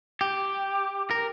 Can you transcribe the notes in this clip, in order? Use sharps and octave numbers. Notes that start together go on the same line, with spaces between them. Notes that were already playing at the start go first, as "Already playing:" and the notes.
G4
A#4